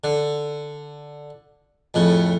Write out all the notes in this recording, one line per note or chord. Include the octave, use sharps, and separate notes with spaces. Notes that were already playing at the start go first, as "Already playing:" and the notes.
D3
F2 A2 C#3